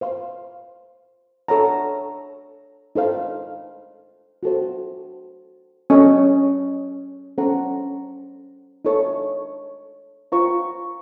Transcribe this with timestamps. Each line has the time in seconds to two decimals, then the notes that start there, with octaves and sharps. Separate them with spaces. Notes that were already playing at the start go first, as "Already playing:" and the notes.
0.01 C5 F5 C6
1.48 A4 C#5 F#5 A#5
2.95 D#4 A4 C5 F5
4.43 F#4 A4 C5
5.90 C#4 A4 D#5
7.38 C#4 A4 C5 F#5 A#5
8.85 D#4 A4 C#5
10.32 F4 C5 F5 A#5 C#6